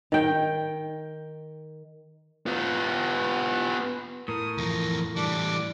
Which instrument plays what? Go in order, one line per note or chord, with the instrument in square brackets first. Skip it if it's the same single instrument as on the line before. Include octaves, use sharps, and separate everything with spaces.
[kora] D#3 G5
[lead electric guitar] B3 F4
[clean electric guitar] A2 [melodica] A#4 [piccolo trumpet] D#6
[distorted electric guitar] E2 F3 [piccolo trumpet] A#5
[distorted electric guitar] E3 G3 [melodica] D4 [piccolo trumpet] D6